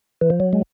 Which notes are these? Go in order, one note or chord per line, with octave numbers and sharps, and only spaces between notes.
E3
F3
F#3
G#3